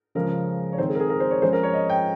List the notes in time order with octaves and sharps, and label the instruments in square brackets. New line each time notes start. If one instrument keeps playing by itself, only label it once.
[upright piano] C#3 F3 G#3 C#4 A#4
C#5
D#3 G#3 C4 C5
G#4
A#4
G#4
A#4
C5
C#5
F3 G#3 C#4 C5
A#4
C#5
D#5
G5